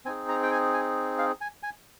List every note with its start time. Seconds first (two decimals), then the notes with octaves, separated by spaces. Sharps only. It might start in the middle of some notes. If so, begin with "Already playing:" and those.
0.05 C4 D#4 G#4 G#5
0.29 A#5
0.43 G5
0.51 G#5
0.74 G#5
1.18 F5
1.41 G#5
1.63 G#5